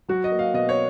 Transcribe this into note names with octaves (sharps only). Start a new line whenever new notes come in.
F#3 F#4
D#5
A#3
F5
B2 D#5
C#5